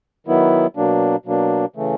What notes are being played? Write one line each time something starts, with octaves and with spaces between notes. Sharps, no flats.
D#3 F#3 B3 E4
B2 F#3 A#3 D4
B2 F#3 A#3 D4
C#3 E3 A3